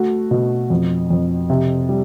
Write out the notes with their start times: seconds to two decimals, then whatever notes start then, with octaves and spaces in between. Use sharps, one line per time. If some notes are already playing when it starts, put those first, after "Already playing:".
Already playing: A3 F#4
0.31 B2
0.70 F2
1.10 F2
1.50 C3
1.89 G3